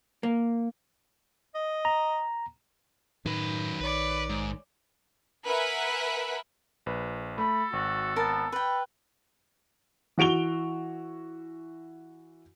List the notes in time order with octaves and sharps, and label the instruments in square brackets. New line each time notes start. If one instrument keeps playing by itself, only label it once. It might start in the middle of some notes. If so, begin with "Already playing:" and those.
[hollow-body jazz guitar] A#3
[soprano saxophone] D#5
[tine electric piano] A#5
[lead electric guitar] F#2 B4 [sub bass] A2 [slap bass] D#3
[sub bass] A#1 [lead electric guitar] B4 [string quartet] C#5 D5
[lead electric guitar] G#2
[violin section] A#4 B4 E5 F#5 G#5
[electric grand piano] A#1 B4
[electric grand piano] A3 [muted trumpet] A4 [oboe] B5
[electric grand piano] G#1 [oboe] F#4
[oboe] B3 [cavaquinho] A#4 A5
[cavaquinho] B4 G5 [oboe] B5
[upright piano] E3 F#4 D7 F7 G7